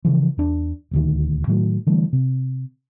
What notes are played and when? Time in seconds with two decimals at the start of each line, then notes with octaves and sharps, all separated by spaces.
0.05 C#3 E3 F3
0.37 E2 D4
0.91 D#1 D2 D#3
1.47 A2 D#3 F#3 A3
1.87 D3 E3 G3 A3
2.13 C3